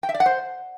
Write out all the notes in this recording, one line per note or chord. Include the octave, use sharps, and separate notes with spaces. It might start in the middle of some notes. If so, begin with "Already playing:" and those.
G5
E5
D5
F#5
C5